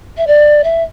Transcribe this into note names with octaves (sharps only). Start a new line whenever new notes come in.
E5
D5
E5